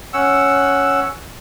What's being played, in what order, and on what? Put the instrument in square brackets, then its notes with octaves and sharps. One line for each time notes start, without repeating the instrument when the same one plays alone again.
[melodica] C#4 F#5 E6